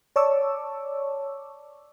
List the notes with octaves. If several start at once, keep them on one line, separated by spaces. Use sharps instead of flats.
C#5 D5 A5 C#6 D6 E6